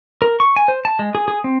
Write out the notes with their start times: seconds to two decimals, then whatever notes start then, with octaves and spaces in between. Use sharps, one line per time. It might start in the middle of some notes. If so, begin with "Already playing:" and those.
0.22 A#4
0.40 C#6
0.56 G#5
0.68 C5
0.85 A5
0.99 G#3
1.15 G#4
1.28 G#4
1.44 C4